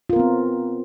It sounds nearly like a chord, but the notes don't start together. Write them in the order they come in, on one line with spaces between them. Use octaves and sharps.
F4 A#4 B3 C4